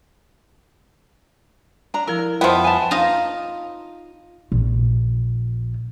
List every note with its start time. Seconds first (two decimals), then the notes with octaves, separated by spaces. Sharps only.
1.94 D4 A#5
2.07 F3 E4 A#4
2.41 F2 F3 B3 F4 B4 D#5 E5 G5
2.64 F5 G#5 A5
2.91 D#4 F4 D#5
4.52 A#1